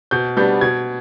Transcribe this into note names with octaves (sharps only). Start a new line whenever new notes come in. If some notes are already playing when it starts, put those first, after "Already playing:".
B2 G6
G3 B3 D4 G6
B2 G#6